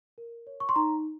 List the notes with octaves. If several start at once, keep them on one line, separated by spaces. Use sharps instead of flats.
A#4
C#5
C#6
C6
D#4 A#5